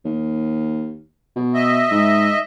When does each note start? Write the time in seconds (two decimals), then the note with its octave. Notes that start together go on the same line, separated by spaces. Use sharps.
0.05 D#2
1.36 B2
1.54 D#5 E5
1.91 G#2